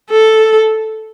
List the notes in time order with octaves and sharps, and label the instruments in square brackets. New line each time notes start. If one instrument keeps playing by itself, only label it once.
[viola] A4